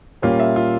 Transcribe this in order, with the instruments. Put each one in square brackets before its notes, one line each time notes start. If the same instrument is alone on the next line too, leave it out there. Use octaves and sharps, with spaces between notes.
[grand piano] A#2 G3 A#3 C#4 F4
E5
F4